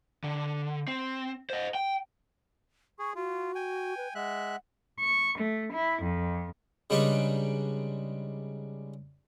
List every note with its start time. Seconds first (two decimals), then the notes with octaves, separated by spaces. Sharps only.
0.24 D3
0.88 C4
1.50 C5 D#5
1.75 G5
2.99 G#4 C#6
3.16 F4 F#4
3.55 G5 G#5
3.97 B4
4.15 G#3 E5 F#5 F#6
5.01 C#6
5.38 A3
5.74 E4
6.04 F2
6.90 C#3 G3 G#3 D4 D#4 B4